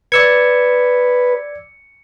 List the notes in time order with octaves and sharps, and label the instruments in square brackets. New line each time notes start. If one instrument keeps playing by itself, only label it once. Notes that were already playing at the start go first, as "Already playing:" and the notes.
[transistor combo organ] B4 [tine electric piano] D5 E6 G#6 [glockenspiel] C#7